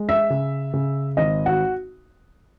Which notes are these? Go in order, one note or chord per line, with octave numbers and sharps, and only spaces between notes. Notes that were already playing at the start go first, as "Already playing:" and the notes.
Already playing: G#3
E5
C#3
C#3
G#1 D#5
F#4